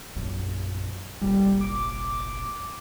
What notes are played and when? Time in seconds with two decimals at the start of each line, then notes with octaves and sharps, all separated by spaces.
0.16 A#1 F#2
1.21 F1 A#1 G3
1.61 D6